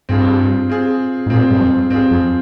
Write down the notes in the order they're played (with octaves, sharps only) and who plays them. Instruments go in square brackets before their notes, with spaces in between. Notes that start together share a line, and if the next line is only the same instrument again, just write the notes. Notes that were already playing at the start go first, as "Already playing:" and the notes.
[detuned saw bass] G2 [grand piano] C4 F4 G#4
[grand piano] C4 F4 G#4
[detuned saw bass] G#2
[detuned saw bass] A#2 [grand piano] C4 F4 G#4
[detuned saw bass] G2
F2
[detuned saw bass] G2 [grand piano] C4 F4 G#4
[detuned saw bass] F2